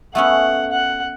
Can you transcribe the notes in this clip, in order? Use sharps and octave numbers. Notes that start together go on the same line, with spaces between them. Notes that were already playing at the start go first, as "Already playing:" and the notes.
A3 B3 C#4 F#5
F#5